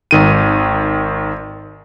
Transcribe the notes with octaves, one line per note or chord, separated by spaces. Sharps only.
G#1 D#3 D#7